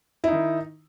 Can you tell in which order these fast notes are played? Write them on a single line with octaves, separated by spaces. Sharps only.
E4 D#4 D#3